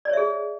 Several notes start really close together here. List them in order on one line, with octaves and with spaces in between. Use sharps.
D5 C#5 E5 G#4